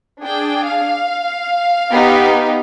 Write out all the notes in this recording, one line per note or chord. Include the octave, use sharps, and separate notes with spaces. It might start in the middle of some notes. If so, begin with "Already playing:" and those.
D4 G#4 G5
F5
B3 D#4 G4